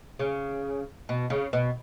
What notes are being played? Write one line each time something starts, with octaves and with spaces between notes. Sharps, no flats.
C#3
B2
C#3
B2